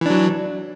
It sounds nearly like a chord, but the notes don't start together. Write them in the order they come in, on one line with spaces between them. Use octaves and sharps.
E3 D4 F#3